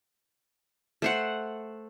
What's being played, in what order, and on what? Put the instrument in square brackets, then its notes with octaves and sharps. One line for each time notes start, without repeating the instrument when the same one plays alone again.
[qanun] A3 C5 F#5